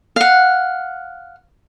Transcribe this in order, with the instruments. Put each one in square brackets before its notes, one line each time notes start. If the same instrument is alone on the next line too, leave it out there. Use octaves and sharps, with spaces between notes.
[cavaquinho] F5 F#5